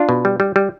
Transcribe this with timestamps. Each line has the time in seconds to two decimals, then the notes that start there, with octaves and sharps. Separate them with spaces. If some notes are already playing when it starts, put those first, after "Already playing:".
Already playing: D4 F4
0.09 B2
0.25 G3
0.40 G3
0.56 G3